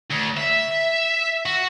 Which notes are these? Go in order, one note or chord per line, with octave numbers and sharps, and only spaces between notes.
D2
E5
F#4